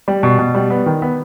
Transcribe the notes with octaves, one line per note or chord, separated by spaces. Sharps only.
G3
B2
B2
G3
B3
D#3
B3